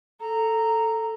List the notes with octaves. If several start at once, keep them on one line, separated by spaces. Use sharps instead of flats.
A4 A#5